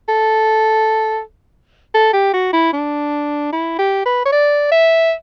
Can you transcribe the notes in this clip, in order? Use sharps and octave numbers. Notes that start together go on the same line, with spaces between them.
A4
A4
G4
F#4
E4
D4
E4
G4
B4
C#5
D5
E5